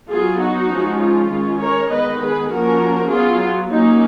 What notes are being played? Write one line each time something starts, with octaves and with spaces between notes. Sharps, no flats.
F#3 B3 F4 G#4
D#4 F#4
F3 G#3 C#4
F4
D#3 G#3 C#4
A#4 C#5
D#3 G#3 B3 B4 D#5
G#4 B4
F3 A#3 C#4 F#4 A#4
F#3 B3 F4 G#4
F#3 A#3 C#4 D#4